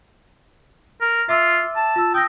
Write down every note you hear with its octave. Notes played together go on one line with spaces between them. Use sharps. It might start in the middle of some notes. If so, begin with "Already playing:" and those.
A#4
F4 E5 D6 E6
A5
F4 E6
G5 D#6 E6 A#6